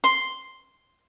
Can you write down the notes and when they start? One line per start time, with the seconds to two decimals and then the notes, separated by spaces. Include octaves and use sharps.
0.04 C6